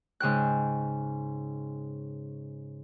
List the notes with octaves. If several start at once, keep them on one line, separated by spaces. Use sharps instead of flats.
G#2 C#3 G5 F#6